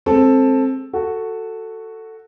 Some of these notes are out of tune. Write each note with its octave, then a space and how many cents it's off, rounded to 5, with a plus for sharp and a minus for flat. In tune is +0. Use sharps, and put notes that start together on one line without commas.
G#3 +0 C4 +15 A4 +0
F#4 +0 A4 +10